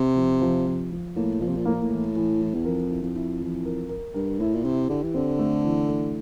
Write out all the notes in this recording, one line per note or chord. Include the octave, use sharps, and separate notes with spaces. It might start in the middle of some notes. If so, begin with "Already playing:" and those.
Already playing: C3
F3
F3
F3
F3
A2 A#3
A#2 F3
C3
A#2
A2 A#3
A#2
A2
E3
E3
E3
E2
F2 A#4
E4
F2
E4
E3
A#4
A#4
G2 A#4
A2 E4
A#2
C3 E4
D3 G4
E3
D3 C4
A3
E3
A3